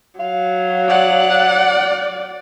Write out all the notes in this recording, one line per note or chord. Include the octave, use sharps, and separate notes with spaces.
F#3 F5
D5 F#5